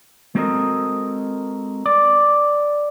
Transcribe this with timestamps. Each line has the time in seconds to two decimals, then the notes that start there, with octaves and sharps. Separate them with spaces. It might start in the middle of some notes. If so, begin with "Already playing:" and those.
0.35 G#3 C4 F#4 A4 A#4 D#5
1.86 D5